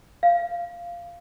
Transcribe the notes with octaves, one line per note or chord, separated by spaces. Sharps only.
F5